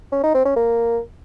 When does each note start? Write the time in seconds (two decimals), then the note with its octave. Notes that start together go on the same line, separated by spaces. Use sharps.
0.12 C#4
0.23 D#4
0.34 C4
0.45 C#4
0.56 A#3